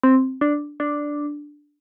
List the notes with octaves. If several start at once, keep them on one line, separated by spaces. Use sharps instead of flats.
C4
D4
D4